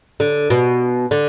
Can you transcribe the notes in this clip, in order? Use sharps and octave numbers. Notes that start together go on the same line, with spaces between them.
D3
B2
D3